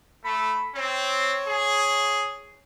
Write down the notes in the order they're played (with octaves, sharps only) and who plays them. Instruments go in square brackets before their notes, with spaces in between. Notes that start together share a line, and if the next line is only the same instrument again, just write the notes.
[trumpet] A3 [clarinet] B5
[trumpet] C4 [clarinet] C#5
[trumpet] G#4